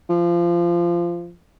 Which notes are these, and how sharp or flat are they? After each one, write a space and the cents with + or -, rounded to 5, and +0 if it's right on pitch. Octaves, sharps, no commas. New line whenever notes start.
F3 -20